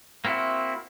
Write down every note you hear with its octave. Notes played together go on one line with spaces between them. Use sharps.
A#3 C4 E4 F#4